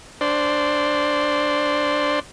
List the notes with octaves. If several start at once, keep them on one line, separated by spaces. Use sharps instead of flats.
D4 C5